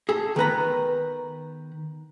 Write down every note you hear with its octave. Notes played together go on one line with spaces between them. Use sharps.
G#4 A4
D#3 B3 B4 A#5